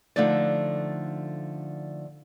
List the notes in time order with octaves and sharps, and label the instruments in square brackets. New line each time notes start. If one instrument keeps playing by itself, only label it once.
[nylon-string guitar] D3 F3 A3 D4 D#4 D5